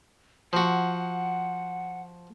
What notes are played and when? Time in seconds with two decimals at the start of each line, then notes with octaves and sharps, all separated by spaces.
0.53 F3 F#4 F#5